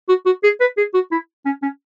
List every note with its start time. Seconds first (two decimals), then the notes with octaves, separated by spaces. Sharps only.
0.09 F#4
0.26 F#4
0.44 G#4
0.60 B4
0.77 G#4
0.94 F#4
1.12 E4
1.46 C#4
1.63 C#4